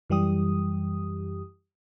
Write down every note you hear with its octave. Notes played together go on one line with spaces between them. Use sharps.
F#2 E3 G3 G4 D#6